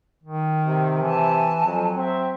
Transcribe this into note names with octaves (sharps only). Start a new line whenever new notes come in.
D#3
C3
E3 G#5 A5
F2 F#3
C4 E5